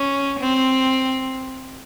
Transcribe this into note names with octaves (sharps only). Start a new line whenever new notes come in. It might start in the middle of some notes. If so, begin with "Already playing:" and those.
Already playing: C#4
C4